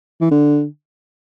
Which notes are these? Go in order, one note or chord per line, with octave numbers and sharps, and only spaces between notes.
E3
D3